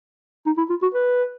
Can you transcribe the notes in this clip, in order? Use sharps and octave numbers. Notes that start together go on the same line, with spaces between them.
D#4
E4
F4
F#4
B4